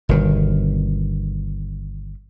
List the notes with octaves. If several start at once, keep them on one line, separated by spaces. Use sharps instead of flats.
G1 B2 D#3